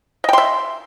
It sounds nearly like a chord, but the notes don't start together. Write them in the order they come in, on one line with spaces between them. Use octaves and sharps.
D#5 G5 C6 E5